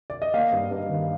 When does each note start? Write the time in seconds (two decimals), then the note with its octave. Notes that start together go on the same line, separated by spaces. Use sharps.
0.10 D5
0.22 D#5
0.34 A#3 F5
0.52 G2
0.71 G2
0.89 D#3